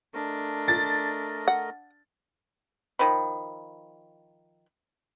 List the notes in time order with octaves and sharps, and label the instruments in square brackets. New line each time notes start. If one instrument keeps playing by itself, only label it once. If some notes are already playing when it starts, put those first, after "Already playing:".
[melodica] A3 A#4 D#5 [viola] D4
[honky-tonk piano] A6
[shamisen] F#5
[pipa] D#3 F3 B5